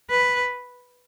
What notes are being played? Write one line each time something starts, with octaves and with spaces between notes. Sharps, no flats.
B4